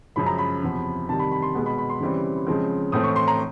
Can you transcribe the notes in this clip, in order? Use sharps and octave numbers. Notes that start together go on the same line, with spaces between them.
F#2 C#3 F3 G#3 B5
A#5
B5
E2 C3 F3
C3 D#3 G3 A5
B5
B5
C6
B2 G#3 B3
B5
B5
C6
C#3 E3 G3 C4
C#3 F3 G#3 C4
A2 E3 A3 C4 D#6
C#6
C6
A#5